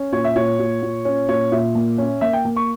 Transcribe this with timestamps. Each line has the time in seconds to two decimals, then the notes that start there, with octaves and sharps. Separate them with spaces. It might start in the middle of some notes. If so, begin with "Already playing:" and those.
Already playing: C#4
0.13 A#2 C#5
0.24 E5
0.36 A#2 C#5
0.59 A#2
0.83 A#2
1.05 C#4
1.29 A#2 C#5
1.52 A#2 E5
1.75 A#3
1.98 C#4
2.21 A#3 E5
2.33 G5
2.45 A#3
2.56 C#6